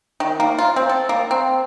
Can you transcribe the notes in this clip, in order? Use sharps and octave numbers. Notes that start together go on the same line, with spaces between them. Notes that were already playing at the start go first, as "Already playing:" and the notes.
D#3
A#3
F4
C4
A4
A#3
C4